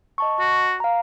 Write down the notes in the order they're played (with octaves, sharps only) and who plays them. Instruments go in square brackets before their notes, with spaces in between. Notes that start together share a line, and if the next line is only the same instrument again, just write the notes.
[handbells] D#5 A5 C#6
[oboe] F#4
[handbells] F5 A#5